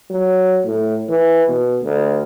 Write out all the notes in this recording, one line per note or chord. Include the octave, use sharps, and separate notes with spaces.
F#3
A2
E3
B2
D2